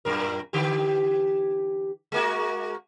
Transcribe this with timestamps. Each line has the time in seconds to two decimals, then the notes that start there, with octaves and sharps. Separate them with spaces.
0.05 F#2 A#2 A#4
0.53 D3 E3 G4
2.12 G#3 A#3 F#4